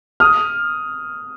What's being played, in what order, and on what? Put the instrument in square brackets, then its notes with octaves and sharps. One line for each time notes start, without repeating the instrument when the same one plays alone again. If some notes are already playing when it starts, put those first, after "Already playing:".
[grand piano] D#6 F6